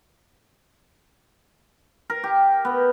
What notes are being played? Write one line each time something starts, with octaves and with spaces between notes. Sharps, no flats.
A#4
G4
B3